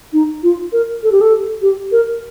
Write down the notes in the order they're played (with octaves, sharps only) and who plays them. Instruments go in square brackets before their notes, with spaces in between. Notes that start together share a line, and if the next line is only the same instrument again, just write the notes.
[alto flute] D#4
F4
A#4
A4
G4
A4
G4
A#4